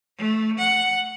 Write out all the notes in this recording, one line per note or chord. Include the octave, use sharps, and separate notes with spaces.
A3
F#5